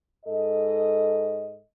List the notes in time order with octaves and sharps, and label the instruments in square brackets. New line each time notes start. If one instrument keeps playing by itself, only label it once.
[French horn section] G#2 A4 D#5